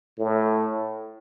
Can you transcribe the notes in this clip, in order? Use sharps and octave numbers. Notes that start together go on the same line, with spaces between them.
A2